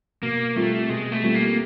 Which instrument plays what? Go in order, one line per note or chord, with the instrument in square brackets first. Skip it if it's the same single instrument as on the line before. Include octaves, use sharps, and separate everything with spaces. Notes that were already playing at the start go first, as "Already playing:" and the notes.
[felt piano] B2 [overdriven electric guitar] A#3
[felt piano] G3 C4 F4 A4 [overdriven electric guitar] A3
[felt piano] B2 [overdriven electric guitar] G#3
[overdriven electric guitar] A3
[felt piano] G3 C4 F4 A4
[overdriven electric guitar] A#3